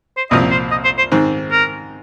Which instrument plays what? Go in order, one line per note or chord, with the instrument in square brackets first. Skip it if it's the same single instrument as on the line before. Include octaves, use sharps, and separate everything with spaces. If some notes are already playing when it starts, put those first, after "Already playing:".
[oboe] C5
[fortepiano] C2 A#2 F3 C4 [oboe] D#5
[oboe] C5
D#5
C5
C5
[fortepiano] G#2 D#3 C4
[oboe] A#4